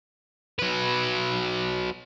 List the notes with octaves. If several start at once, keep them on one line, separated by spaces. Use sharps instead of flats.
F#3 B4